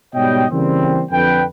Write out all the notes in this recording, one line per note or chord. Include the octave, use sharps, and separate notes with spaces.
G#2 B2 G3 C#5 D#5 G5
C#3 E3 G3 A#3 C4
F2 D3 B4 G5